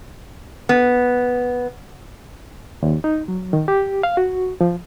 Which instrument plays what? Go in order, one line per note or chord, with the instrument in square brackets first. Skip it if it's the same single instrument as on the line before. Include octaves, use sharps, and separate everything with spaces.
[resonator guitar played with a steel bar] B3
[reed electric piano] D#2
D#4
F#3
D#3
G4
F5
F#4
F3